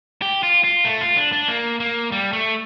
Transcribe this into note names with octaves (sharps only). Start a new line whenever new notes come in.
G4
F4
F4
A3
F4
D4
D4
A#3
A#3
G3
A3